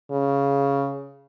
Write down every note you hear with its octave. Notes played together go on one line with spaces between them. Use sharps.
C#3